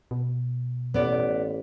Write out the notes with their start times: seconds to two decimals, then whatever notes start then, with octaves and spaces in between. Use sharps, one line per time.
0.11 B2
0.94 A1 B3 D5